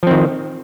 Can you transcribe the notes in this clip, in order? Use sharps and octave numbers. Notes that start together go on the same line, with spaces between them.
D#3 F3 C4